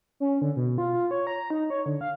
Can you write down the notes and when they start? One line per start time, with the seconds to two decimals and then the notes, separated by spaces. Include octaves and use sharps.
0.20 C#4
0.42 D3
0.56 B2
0.78 F4
0.93 F4
1.11 C#5
1.27 A#5
1.50 D#4
1.70 C#5
1.86 D3
2.01 F5